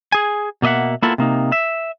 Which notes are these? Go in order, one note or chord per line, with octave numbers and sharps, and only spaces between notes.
G#4 G#5
B2 A#3 D#5 E5 F#5
A#3 B3 E4 F4 A4
C3 A#3 D#4
E5